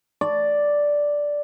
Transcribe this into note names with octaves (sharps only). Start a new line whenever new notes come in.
D5